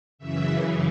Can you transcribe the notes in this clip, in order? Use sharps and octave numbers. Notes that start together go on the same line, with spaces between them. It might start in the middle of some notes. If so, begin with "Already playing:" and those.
F#2 C#3 E3 E5